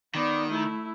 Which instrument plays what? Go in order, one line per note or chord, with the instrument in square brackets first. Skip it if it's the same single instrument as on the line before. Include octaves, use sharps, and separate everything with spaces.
[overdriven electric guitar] D#3 [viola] B3 D5
[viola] A3 E4